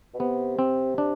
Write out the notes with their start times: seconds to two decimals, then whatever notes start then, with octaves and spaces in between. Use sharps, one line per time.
0.14 B2
0.19 C3 B3
0.59 C4
0.98 D4